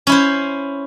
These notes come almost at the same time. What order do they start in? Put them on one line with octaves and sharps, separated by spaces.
C#4 E4 C5